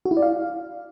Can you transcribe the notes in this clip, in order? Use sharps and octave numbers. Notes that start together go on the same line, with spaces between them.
F#4
E4
D5
F5